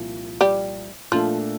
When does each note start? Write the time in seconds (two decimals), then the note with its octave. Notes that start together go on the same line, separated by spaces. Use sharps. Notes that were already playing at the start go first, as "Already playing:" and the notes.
Already playing: C2 A#2 F3
0.41 G3 G4
1.11 A#2 F3 A3 D4 F4 A4